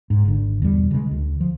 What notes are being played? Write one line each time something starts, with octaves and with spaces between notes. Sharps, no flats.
G#2
G#1 D3
E2 B2 G3
C#3 G#3
D2
F3